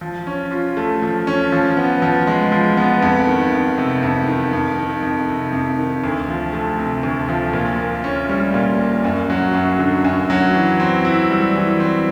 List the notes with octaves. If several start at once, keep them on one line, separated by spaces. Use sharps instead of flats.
F3
C#4
F4
A3
F3
C#4
F3
B3
F3
G#3
F3
B3
F2
D#3
F2
C3
F2
D#3
F2
D#3
F2
C3
F2
D#3
D2
F3
A3
C3
D2
F3
A#2
A#3
C#4
G3
A#2
A#3
F#2
F#3
F#2
D3
F#2
F#3
E3
C4
E4
G3
E3
C4